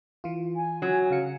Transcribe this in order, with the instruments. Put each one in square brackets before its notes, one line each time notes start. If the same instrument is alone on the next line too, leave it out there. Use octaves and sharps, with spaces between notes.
[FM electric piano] E3 F4
[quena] G#5
[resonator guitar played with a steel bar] F#3
[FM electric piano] C#3 F5 C#7